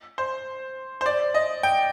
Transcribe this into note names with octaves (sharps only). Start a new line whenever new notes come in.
C5
C5
D5
D#5
G5